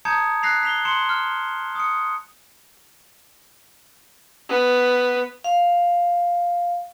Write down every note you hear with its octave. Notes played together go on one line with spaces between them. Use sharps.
A5 A#5 D#6 G6 G#6 C#7
F#6 A#6 C7 F7
B6 F7 G7
C6 C#7 E7 G7
F6
D#6 C#7
B3
F5